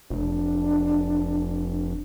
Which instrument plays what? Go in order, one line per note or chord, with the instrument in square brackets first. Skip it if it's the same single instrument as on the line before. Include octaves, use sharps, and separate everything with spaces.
[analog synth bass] F1 [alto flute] D4